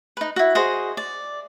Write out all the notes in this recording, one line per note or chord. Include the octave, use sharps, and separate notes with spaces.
D#4 B4
E4 F#4
F#4 G#4 C5 D#5
D5